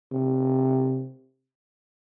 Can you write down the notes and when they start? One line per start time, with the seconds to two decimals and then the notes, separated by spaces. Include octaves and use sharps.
0.12 C3